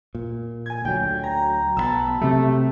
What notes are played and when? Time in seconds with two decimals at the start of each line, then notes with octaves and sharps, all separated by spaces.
0.15 A#2
0.66 G#5 G#6
0.85 D2 F#3 G5
1.23 A#5
1.77 B1 F3 B3 A5 B5 E6
2.21 C3 F#3 A3